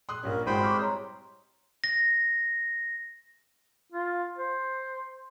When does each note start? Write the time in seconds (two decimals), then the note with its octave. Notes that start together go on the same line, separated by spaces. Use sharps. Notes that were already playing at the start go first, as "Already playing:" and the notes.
0.09 A#2 C6 D#6 F#6
0.23 A#1 G3 C#4 A#4
0.47 G#1 G#3 E4 F#4 C5 G5 B5
0.63 G3 C4 C#6 D6 F6
0.81 C#5 A#5 C6
1.84 A#6
3.92 F4
4.38 C5